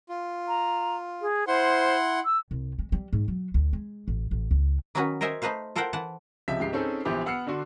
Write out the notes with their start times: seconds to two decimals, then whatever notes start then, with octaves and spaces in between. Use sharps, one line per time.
0.09 F4
0.48 A#5
1.21 G#4
1.47 E4 C5 F#5 C6
2.25 E6
2.51 C2
2.79 G#3
2.92 G3
3.13 G#2
3.28 F#3
3.54 D2
3.73 G#3
4.08 A1
4.31 A1
4.51 C#2
4.95 D#3 F#3 B3 C#4 F#4 B4
5.21 A#4 C5 D#5 E5 G#5
5.42 A3 D#4 B4 C5 F5
5.76 F4 A4 A#4 C5 F#5 G5
5.93 E3 F#5 A5
6.48 C#2 C3 F3 E5 B6
6.60 C#2 G#2 G4 C7
6.73 C4 C#4 D#4 G#4 A4 C5
7.05 A#1 E3 B3 G4 C5 D6
7.26 B3 F#5 E6 F6 C7 C#7
7.47 D3 D4 F#4 C6